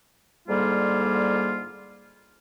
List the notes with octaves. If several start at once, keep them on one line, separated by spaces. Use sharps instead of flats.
G#2 D3 G3 A#3 F4